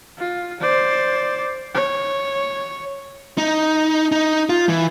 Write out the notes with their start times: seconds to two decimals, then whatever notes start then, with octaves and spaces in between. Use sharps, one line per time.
0.18 F4
0.61 C5 D5
1.74 C#5
3.38 D#4
4.12 D#4
4.49 F4
4.69 E3